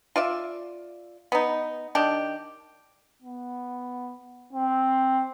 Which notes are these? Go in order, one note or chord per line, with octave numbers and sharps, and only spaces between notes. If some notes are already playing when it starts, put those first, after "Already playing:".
F4 D5 E5
B3 D#4
D#3 D4 G4
B3
C4